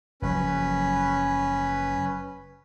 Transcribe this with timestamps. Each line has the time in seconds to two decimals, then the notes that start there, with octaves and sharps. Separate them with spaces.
0.22 F#1 F3 F#3 C#4 B4